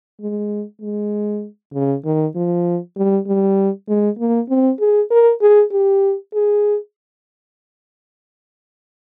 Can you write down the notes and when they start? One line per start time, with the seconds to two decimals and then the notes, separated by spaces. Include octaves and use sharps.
0.21 G#3
0.82 G#3
1.74 C#3
2.05 D#3
2.35 F3
2.97 G3
3.27 G3
3.88 G#3
4.18 A#3
4.49 C4
4.80 G#4
5.11 A#4
5.41 G#4
5.71 G4
6.34 G#4